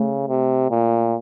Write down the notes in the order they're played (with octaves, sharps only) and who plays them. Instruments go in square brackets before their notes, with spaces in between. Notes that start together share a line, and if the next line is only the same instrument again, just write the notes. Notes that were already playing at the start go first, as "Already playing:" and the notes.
Already playing: [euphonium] C#3 [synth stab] A3
[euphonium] C3
A#2